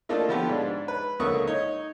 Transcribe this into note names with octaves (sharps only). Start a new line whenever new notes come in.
A3 A#3 D4 D#4 F4 A4
D3 F3 B3 F4 G4
G#2 D4
B4
C#2 D3 A#3 E5 C#6 D#6
D#4 C#5